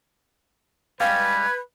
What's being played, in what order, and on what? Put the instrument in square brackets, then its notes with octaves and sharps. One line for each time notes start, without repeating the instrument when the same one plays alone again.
[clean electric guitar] G3 G#3 C#4 [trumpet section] B4 [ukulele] F5 G5 [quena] G#6